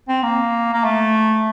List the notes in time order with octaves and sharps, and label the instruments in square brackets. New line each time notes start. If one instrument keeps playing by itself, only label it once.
[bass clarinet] C4
A#3
A#3
A3